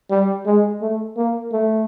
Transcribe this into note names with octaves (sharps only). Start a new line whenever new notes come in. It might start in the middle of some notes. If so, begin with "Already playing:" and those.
G3
G#3
A3
A#3
A3